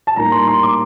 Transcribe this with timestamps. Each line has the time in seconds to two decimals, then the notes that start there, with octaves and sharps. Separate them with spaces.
0.07 A5
0.16 A2 G3 A#3 D#4 A#5
0.32 C6
0.48 C6
0.63 D6